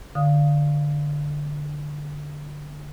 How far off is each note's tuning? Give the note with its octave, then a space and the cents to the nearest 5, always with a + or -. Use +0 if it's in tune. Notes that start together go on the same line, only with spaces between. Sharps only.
D3 +0 F5 +0 D#6 +0